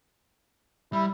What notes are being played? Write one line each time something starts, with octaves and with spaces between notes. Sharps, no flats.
G3 E4